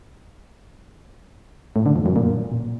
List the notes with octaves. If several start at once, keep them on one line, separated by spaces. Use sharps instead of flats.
A2
D3
F2
F#2
A#2